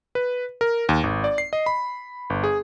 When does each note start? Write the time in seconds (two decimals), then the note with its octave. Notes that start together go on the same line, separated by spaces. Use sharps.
0.15 B4
0.61 A#4
0.89 D#2
1.04 G#1
1.24 D5
1.38 C7
1.53 D#5
1.66 B5
2.30 G1
2.44 G#4